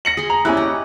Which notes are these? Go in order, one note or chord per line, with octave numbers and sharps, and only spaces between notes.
A#6 C#7 F#7
G#4 C6
A#5
C#4 E4 G4 D5 F#6
D#5 A#5